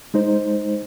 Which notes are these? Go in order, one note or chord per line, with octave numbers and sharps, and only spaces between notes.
G#3 D#4 C5